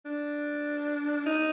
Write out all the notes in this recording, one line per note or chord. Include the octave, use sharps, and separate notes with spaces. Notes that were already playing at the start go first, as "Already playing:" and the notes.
D4
D#4